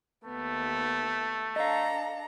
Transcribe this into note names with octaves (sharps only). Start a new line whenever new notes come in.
D#2 A3 B3
D4 A4 D#5 F5 A#5